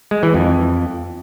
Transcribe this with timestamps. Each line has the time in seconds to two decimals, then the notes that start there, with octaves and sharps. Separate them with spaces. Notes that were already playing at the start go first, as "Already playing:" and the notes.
0.11 G#3
0.23 E3
0.35 F2